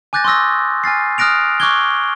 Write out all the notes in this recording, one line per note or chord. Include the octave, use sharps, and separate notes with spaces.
G#5 D6 F#6 G6 A6 A#6
C6 C#6 D#6 E6 A#6
G#5 F6 A6 C7
D#6 F6 F#6 A#6 D7 F7
C#6 D6 F6 F#6 G#6 G7